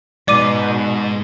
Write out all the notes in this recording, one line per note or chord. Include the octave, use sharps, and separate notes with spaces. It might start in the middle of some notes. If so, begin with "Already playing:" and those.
G#2 B2 D5 D6 D#7